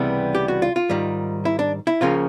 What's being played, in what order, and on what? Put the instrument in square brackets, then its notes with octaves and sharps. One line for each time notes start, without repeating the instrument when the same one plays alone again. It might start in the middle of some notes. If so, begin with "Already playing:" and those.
Already playing: [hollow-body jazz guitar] C#2 C3 E3 G3 B3
G4
F#4
F4
F4
G#2 D#3 G3
E4
D4
E4
C#2 C#3 F3 A#3 C#4 F4